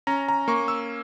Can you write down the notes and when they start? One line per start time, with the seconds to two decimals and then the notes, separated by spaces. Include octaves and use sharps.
0.07 C#4 A#5
0.28 A#5
0.48 A#3 C#6
0.68 E6